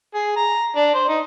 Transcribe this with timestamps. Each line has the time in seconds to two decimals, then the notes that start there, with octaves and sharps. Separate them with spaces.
0.14 G#4
0.36 A#5
0.76 D4
0.94 C5
1.09 D#4